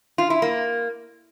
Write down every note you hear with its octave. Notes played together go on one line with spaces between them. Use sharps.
F4
E4
A#3